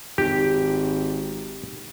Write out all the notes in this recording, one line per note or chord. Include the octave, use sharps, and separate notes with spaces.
G#1 G4